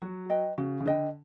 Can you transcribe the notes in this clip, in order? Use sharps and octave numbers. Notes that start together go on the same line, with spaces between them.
F#3 F#4
B4 D#5 G5
C#3 F#4
C#3
D3 B4 D#5 G5